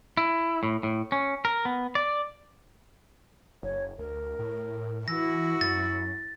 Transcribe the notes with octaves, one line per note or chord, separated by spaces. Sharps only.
E4
A2
A2
C#4
A#4
B3
D5
F#1 C#5
D2 A#4
A2
E3 E4 F#4 E6 A#6
F#2 A6